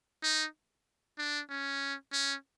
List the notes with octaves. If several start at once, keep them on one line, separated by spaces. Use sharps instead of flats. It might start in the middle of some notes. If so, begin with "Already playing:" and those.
D#4
D4
C#4
C#4